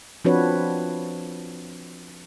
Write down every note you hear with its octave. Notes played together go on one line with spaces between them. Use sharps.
F3 C4 D4 F#4 B4 C#5